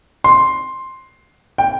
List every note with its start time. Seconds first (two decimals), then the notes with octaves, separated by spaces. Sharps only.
0.24 C6
1.58 G5